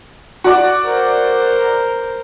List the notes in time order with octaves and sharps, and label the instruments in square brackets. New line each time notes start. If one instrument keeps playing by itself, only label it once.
[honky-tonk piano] F#4 D5
[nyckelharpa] A#4 C5